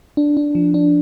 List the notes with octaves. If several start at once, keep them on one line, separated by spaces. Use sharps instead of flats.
D4
D4
F3
D4